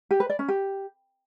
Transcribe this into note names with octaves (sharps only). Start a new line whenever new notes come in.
G4
B4
D5
C#4
G4